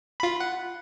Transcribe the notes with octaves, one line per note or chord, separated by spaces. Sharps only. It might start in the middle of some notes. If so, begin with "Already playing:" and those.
F4 B5
F#5